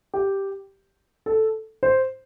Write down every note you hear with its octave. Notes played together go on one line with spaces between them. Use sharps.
G4
A4
C5